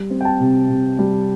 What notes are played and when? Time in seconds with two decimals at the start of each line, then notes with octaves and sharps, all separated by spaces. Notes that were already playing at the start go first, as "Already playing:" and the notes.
Already playing: G3
0.10 C4
0.21 G5
0.25 A5
0.40 C3
0.69 C3
0.99 G3